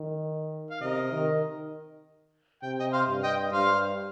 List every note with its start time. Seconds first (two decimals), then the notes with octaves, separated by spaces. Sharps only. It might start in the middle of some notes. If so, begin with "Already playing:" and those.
Already playing: D#3
0.71 F5
0.81 C3 A#4 D#5
1.12 D#3
2.63 C3 G5
2.79 D#5 G5
2.93 C5 F5
3.08 G2
3.23 D#5 G5
3.53 G2 C5 F5